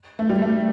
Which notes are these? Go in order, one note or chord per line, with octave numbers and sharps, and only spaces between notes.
A3
G3
A3